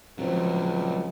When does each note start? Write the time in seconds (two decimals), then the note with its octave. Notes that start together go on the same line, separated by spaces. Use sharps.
0.18 C#2 F3 F#3 A3 C4 C5